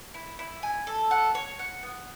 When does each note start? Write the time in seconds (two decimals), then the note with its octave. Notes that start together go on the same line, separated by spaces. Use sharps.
0.14 E4
0.39 E4
0.63 G#5
0.87 A4
1.11 F#5
1.35 C#5
1.59 F#5
1.83 B3